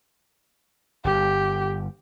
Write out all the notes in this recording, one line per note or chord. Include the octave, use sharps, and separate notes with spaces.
G1 G4